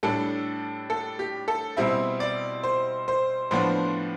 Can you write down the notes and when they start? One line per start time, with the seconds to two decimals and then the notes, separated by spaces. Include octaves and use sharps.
0.03 A2 G3 D4 A4
0.90 A4
1.19 G4
1.48 A4
1.77 B2 G3 C4 E4 E5
2.20 D5
2.63 C5
3.08 C5
3.51 A2 F3 B3 D4 C5